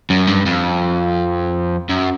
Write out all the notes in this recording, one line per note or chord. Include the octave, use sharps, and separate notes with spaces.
F#2
G2
F2
F#2